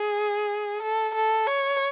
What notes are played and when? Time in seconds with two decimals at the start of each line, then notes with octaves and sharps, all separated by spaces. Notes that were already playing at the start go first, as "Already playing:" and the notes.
Already playing: G#4
0.82 A4
1.15 A4
1.47 C#5